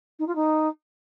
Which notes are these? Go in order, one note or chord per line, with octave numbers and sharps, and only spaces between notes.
D#4
F4
D#4